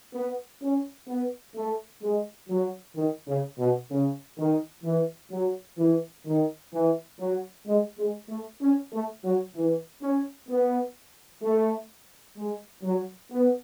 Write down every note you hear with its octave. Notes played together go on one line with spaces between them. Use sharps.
B3
C#4
B3
A3
G#3
F#3
D#3
C#3
B2
C#3
D#3
E3
F#3
E3
D#3
E3
F#3
G#3
G#3
A3
C#4
A3
F#3
E3
C#4
B3
A3
G#3
F#3
B3